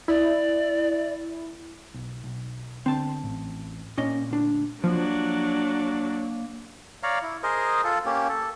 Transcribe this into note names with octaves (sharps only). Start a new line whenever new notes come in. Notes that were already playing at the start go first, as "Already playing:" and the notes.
E4 D5
B1
B1
D3 C4 A5
A1
A#2 A#3 C#4 D#5
D2 D4
F3 F#3 A#3 D4
C#5 D5 F5 A#5
E4
G#4 A#4 C5 D#5
F4 A4
A#3 C#4 G4
A4